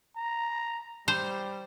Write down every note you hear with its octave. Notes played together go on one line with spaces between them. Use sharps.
A#5
G3 C5